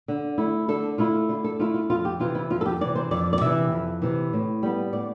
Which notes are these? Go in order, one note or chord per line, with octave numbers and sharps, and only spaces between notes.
D3
A3 E4
D3 A4
A3 E4 F4
D3 F4
A4
A3 E4 F4
F4
F2 F4
G4
C3 E3 F4
E4
F2 F4
A4
G4
C3 E3 D5
C5
F2 D5
D5
C3 E3 E5
F2
C3 E3
A2
G3 B3
A2 D5